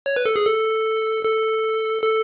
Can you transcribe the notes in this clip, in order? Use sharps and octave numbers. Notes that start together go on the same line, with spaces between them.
C#5
B4
A4
G#4
A4
A4
A4